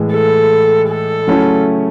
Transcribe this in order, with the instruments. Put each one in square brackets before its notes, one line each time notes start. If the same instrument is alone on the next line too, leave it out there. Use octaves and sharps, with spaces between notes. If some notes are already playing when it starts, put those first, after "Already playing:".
Already playing: [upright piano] A2 E3 G#3
[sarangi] A4
A4
[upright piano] C#3 F#3 A3 C#4 E4